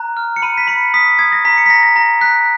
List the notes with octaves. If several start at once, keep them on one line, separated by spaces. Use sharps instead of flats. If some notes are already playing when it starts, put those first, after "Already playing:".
Already playing: A#5 F#6
F6
C#7
B5 D#7
B6
B5 C#7
D#6 B6
D#6 G#6
A#6
A#5 B6
C#7
B6
A#5 A#6
A#6
A#5 A#6
F#6 B6